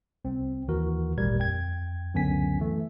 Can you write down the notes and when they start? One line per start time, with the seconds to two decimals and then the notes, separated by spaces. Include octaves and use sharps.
0.25 C2 C4
0.68 D#2 E3 F#4 A#4
1.17 G#1 D2 A#2 G3 A#4 G#6
1.39 F2 G5 G#6
2.14 C#2 F#2 D3 B3 G#5 B6
2.59 E3 A3